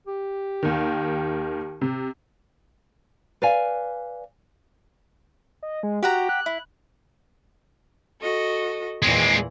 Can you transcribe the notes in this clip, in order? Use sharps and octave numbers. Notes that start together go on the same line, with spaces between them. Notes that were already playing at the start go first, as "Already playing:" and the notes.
G4
D#2 D#3
C3
B4 D5 F5 G#5
D#5
G#3
F#4 G4 F#5 A#5
F#6
E4
F#4 A4 D#5
E2 A#2 E3 G#3 C4